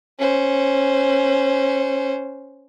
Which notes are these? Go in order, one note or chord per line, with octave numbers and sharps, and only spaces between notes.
C#4 C5